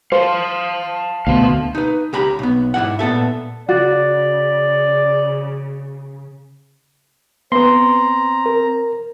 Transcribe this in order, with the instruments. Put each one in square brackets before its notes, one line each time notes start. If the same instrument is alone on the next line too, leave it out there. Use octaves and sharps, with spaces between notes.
[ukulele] C5 [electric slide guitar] F5 G#5 A5
[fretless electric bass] D2 B2 [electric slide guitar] F5 A5
[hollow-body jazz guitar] D#4 B4
C#2 G4 A#5 B5
B1 B3
G#2 C3 E4 F#5
A#2 B3 A4 E5
[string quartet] C#3 [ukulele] F#4 [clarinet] D5
[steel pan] B3 B4 [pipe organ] C4 A#5 [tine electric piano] C6
[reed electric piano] A#4